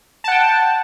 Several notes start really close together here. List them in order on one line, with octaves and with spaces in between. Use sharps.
A5 F#5 G5